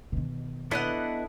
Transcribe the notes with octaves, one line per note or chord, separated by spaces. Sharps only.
B2 D#3
B3 D4 E4 A4 D#5 F#5